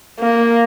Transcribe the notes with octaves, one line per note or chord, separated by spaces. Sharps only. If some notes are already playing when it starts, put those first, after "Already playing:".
A#3